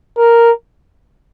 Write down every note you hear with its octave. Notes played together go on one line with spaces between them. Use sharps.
A#4